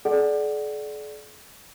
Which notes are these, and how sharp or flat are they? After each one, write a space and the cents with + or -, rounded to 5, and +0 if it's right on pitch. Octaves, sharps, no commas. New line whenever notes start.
G#4 +45 D5 +0 F#5 +15